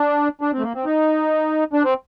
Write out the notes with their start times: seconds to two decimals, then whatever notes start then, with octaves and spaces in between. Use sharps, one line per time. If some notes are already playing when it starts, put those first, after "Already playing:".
Already playing: D4
0.41 D4
0.53 C4
0.59 A3
0.63 A#3
0.75 C4
0.85 D#4
1.73 D4
1.84 C4